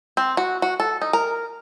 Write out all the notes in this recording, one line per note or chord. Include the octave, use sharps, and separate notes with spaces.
C4
F#4
F#4
A4
D#4
A#4